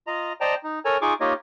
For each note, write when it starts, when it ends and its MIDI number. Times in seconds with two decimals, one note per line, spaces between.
0.07 0.33 65
0.07 0.33 75
0.07 0.33 82
0.41 0.55 72
0.41 0.55 74
0.41 0.55 75
0.41 0.55 79
0.41 0.55 81
0.41 0.55 82
0.64 0.79 63
0.85 0.98 69
0.85 0.98 70
0.85 0.98 73
0.85 0.98 80
0.85 0.98 82
1.01 1.14 63
1.01 1.14 65
1.01 1.14 68
1.01 1.14 80
1.01 1.14 85
1.01 1.14 86
1.20 1.34 58
1.20 1.34 63
1.20 1.34 65
1.20 1.34 67
1.20 1.34 73
1.20 1.34 75